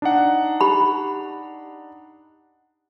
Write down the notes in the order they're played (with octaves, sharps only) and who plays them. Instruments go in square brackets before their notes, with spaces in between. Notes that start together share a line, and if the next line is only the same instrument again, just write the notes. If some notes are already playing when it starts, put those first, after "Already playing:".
[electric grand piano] D4 D#4 F#5
[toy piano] G4 B5